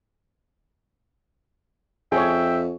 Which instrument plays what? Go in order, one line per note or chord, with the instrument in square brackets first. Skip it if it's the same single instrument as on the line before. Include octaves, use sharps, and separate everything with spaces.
[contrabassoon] F2 [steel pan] G#4 C#5 [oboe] E5 [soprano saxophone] G5